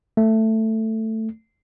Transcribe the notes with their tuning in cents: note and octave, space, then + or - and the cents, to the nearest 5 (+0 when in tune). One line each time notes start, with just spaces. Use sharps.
A3 +10